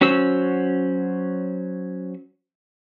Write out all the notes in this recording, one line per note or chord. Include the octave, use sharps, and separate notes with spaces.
F#3 C#4 F#4 C5 E6